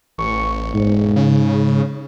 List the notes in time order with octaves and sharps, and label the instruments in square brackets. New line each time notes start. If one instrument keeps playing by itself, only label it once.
[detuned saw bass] A1 [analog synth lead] C#6
[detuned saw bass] E1 [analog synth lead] G#2
[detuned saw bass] C#3